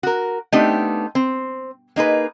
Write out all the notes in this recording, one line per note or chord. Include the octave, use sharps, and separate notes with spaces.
F#4 A#4
A3 B3 C4 D4 D#4 G4
C4
A#3 D#4 G#4 B4